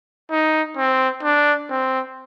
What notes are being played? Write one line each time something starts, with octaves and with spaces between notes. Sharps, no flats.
D#4
C4
D4
C4